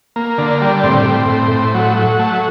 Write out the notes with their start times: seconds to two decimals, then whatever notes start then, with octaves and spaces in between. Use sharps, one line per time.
0.16 A#3
0.38 D3
0.61 G3
0.84 A2 C4
1.06 A2
1.29 A2
1.51 A2
1.75 F#3
1.97 F#3
2.19 A3